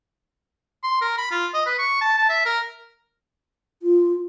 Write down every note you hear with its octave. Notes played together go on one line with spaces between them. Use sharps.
C6
A#4
B5
F4
D#5
B4
C#6
A5
A5
E5
A#4
F4